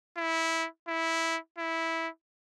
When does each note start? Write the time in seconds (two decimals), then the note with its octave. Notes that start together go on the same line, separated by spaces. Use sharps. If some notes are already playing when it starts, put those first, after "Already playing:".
0.17 E4
0.88 E4
1.58 E4